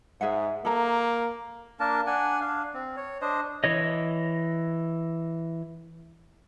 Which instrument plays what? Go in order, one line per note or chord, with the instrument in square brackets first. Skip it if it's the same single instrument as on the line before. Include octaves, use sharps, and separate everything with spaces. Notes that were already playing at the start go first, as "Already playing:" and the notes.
[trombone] G#2 [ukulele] G#4 E5 F#5
[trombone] A#3 [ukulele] A4 A#5
[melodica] A#3 D4 A#4 A5
D4 F#5 G#5
D4 F5
C4
C#5
D4 C5 D#5
[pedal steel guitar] E3 C#5 D#5